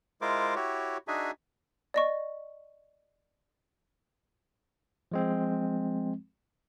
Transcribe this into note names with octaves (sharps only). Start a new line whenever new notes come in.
G#3 E4 F4 A#4 C5 D6
E4 F#4 G4 C#5
D4 D#4 F#4 G#4 E5 G#5
D5 D#5 C#6
F3 G#3 C4